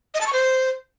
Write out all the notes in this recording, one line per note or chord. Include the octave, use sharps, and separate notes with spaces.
D#5
A5
C#6
C5